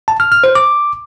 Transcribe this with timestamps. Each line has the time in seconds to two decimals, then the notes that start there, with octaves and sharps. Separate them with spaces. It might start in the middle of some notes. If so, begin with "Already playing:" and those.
0.08 A5
0.20 F6
0.32 F6
0.44 C5
0.55 D6